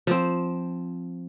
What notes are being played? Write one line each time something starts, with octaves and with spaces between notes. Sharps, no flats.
F3 C4